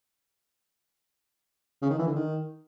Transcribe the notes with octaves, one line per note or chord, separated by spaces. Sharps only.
C#3
D#3
E3
D3
D#3